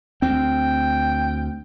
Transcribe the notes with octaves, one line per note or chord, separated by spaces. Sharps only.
D2 C4 G5